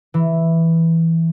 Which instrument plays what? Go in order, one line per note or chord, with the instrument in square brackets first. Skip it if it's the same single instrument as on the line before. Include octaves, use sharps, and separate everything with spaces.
[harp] E3